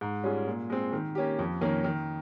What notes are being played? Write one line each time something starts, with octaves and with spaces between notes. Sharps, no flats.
G#2
G3 C#4 F4 G#4
A#2
G#3 C4
D#3
A#3 C#4 G4
F2
D#3 A#3 C#4
D#3